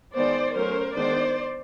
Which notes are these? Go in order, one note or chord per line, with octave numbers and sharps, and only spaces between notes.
D#3 G#3 B3 C5 D5
F#3 A3 C#4 A#4 C5
D#3 G#3 B3 D4 C5 D5